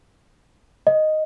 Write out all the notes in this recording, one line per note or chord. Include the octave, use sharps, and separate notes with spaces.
D#5